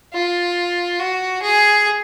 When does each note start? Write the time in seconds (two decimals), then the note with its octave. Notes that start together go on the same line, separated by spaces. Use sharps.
0.13 F4
1.00 F#4
1.42 G#4